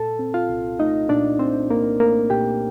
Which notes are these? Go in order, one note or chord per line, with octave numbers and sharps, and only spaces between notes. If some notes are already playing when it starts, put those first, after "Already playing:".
Already playing: A#2 A4 A5
C4
F4 F5
C2
A3 D#4 D#5
A#2 D4 D5
C4 C5
C2 A#3 A#4
A3 A#3 A#4
A#2 G4 G5